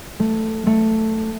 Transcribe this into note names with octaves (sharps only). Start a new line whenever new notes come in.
A3
A3